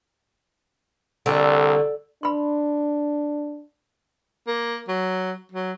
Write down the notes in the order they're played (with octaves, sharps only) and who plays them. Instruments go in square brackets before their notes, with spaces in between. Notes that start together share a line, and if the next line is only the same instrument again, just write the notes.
[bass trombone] C2 [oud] D3
[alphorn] D4 [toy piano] B5 C6
[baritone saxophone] A#3
F#3
F#3